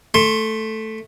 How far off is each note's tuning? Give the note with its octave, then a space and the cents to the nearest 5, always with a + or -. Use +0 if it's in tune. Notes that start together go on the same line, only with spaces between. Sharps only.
A3 +0 C6 +15